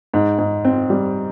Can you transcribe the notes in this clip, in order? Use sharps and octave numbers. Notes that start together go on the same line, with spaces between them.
G#2
G#2
C4
G3